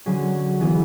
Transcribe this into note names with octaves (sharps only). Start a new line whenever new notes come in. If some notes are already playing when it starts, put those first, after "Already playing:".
D3 F#3 C#4 G#4
E3 B3 G#4